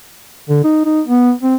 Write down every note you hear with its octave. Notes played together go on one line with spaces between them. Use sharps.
D3
D#4
D#4
B3
C4